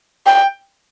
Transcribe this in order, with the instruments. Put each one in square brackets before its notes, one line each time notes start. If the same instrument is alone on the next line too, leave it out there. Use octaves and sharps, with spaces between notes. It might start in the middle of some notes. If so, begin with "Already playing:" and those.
[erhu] G5